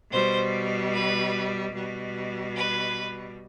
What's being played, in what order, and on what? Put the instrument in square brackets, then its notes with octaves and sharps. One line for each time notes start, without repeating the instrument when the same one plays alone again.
[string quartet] B2 G3 C5
B4
B2 G3
B4